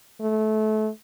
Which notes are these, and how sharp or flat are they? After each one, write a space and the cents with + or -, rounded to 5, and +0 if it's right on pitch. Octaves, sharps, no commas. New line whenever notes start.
A3 -25